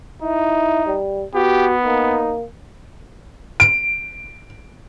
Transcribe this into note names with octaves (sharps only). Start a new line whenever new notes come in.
D#4 E4
G3
B3 F#4 G4
A#3 D#4
D7